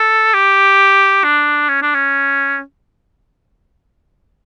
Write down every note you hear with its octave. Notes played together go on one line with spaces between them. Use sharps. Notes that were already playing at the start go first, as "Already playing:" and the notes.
Already playing: A4
G4
D4
C#4
D4
C#4